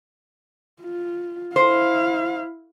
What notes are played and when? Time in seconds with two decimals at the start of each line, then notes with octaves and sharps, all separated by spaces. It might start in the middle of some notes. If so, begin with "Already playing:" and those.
0.81 F4
1.56 E4 C5 F5